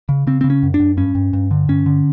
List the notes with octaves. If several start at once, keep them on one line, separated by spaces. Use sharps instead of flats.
C#3
C#3 C4
C#3 C4
C#4
F#2
D4
F#2
G2 C#4
G2
G2
D3
G2 C#4
D3